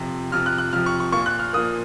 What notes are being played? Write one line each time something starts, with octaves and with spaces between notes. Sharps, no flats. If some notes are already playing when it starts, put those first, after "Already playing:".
Already playing: F2 C3 F3
F2 C3 F3 F6
F#6
F#6
F2 C3 F3 F6
C#6
C#6
A#2 F3 A#3 C#6
F#6
F6
A#2 F3 A#3 D#6